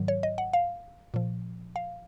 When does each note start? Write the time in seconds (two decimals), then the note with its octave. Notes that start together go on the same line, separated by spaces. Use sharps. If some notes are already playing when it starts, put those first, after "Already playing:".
Already playing: G#2 D#3 F#3
0.08 C#5
0.23 D#5
0.38 F#5
0.53 F5
1.14 A#2 F3
1.76 F5